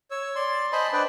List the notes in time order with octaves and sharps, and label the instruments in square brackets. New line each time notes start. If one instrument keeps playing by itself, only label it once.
[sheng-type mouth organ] C#5 E6
[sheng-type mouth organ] D5 [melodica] C6
[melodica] C5 D#5 B5 [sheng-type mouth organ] G#5 A5 C6
[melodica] D4 B4 [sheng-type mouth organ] D5 G5